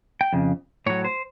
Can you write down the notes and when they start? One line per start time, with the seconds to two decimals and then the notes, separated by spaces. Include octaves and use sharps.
0.21 G5
0.33 F2 C#3
0.86 A2 F#3 C#5
1.04 C5